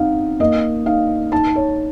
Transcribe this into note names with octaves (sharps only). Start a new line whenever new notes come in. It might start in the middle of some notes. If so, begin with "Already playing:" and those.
Already playing: C4 D#4 F5 F#5
A#3 D#5
D#4 F5
D#4 A5
C#5